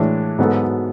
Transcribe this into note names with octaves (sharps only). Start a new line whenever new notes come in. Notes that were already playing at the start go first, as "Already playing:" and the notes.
Already playing: A2 E3 G#3 D4
G#2 F#3 B3 F#4 A4